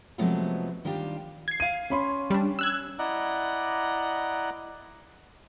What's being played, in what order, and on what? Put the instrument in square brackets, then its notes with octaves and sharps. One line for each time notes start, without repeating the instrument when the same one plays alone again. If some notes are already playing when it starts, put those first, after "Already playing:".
[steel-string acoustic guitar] C3 F3 F#3 G#3 A3 B3
D#3 G3 D4 F4 G4
[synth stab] G#6 C7
[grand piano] F5 D#7
C#4 B5 C6
[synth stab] G3 D4
E6 F#6 G#6
[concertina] E4 D5 D#5 F#5 A#5